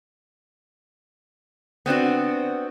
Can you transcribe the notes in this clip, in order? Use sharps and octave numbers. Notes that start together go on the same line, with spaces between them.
B3 C4 D4 F#4